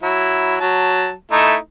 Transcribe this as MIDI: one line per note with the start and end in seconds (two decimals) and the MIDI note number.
0.02 0.55 54
0.02 0.55 64
0.61 1.12 54
0.61 1.12 81
1.32 1.55 57
1.32 1.55 63
1.32 1.55 64